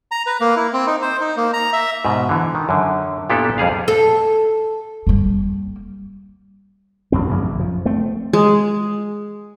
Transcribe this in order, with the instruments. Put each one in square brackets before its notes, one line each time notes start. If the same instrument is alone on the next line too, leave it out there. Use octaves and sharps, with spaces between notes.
[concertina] A#5
B4
A#3
E4
C4
D#4
C5
D#4
A#3
A#5
E5
[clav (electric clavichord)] G#2 B2
D3 E3
D#3
F#2 D3
A#2 B3 D4 E4 G4 A4
F2 G3 G#4 F5
[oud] A4
[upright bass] G3 A#3
[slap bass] A1 F2 C4
A1 F#2 C#3
F3
A3 C4
[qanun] G#3